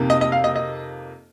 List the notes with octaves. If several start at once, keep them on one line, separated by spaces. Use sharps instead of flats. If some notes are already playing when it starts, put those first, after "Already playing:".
Already playing: F2 C3 A#3 D#4
D#5
D#5
F5
D#5
D#5